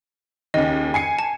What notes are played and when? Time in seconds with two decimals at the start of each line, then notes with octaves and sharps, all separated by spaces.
0.54 D#2 C#3 C#4 D#5
0.94 G#5 C7 C#7
1.19 A5